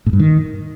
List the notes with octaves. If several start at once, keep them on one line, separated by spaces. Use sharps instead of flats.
A2
G2
D#3